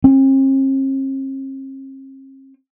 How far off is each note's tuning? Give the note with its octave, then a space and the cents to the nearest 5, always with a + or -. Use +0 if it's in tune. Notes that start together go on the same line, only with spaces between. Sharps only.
C4 +45